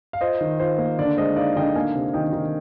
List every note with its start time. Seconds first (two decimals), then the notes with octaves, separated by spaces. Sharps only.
0.13 F5
0.21 F4 C5 D#5
0.41 D#3
0.59 F4 C5
0.78 A#3
0.99 D3 D5
1.17 G#3 C5 D#5
1.36 D#4 D5 F5
1.56 D3 D#5 G5
1.75 A#3 F5 G#5
1.95 C3
2.13 D#3 D#5 G5
2.33 D#3